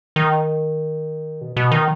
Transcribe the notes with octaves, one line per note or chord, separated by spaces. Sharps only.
D#3
B2
B2
D#3